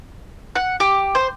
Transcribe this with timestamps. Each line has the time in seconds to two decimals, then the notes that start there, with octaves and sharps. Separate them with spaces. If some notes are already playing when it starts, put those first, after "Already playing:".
0.55 F#5
0.80 G4
1.15 C5